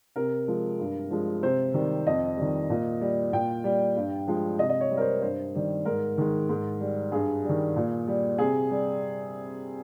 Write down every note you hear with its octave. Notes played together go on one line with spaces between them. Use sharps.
C3 A#4
F3 G#3
G2
F3 G#3
C3 C5
D#3 G3
F2 D#5
D#3 G3
A#2
G3
A#2 G5
G3
G2
F3 G#3
C3 D#5
D#5
C#5
G3
A#4
C5
G2 C5
D#3 G3
G#2 A#4
D#3 G#3
G#2
G3
G2 G#4
G3
D#3
A#2
G3
C3 G#4
G3